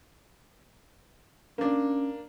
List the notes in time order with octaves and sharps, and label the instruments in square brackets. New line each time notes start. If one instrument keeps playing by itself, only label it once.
[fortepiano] A#3 D4 [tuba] C#4